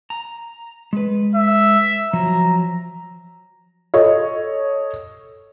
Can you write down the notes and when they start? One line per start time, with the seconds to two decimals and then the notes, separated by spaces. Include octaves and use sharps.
0.10 A#5
0.93 G#3 B4
1.36 E5
2.13 F3 F#3 A#5
3.94 A4 C#5 D#5